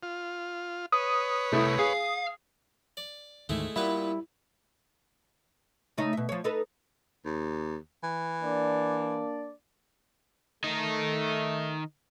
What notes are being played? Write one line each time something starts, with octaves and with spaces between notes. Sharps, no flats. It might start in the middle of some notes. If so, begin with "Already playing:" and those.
F4
B4 C#5 D#6
C2 A3 E4
G#4 F5
D5
D2 G#2 D#3 G#3 A3 E4
A#2 G3 B3 E4 B4
C#3 A3 D#4
B2 E5
F3 C#5
D#4 A4 B4
D#2
E3
A#3 D4 D5
D#3 A3 D#4